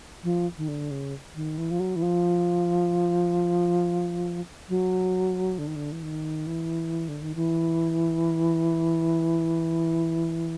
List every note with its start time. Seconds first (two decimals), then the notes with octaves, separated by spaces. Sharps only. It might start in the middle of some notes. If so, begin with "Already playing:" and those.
0.23 F3
0.57 D#3
0.68 D3
0.91 C#3
1.35 D#3
1.58 E3
1.71 F3
1.80 F#3
1.96 E3
2.02 F3
4.69 F#3
5.58 D3
5.67 D#3
5.76 D3
5.92 E3
6.03 D#3
6.47 E3
7.08 D3
7.22 D#3
7.35 E3